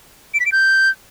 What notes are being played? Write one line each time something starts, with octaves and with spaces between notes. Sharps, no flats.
D7
B6
D7
G6